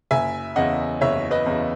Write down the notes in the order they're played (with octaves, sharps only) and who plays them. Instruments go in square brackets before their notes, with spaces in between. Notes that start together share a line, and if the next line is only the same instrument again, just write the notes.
[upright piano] F#1 E5 G#5
E2 C#3 D#5 F#5
F#1 C#5 E5
B4 D#5
E2 C#3